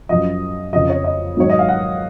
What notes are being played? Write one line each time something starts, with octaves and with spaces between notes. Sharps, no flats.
F#2 F3 D#5
F2 C#3 F3 D#5
C#5
D#5
G#2 D#3 F#3 C#5
D#5
F5
F#5